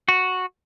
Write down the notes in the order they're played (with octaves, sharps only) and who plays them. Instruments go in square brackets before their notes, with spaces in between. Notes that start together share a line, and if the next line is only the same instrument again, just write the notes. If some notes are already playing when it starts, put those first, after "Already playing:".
[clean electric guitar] F#4